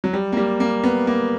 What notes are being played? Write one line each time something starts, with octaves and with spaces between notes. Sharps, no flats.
F#3
G3
A#3
G3
A#3
B3
A#3